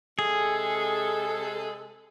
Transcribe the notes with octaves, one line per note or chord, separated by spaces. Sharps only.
C3 G#3 G#4 A4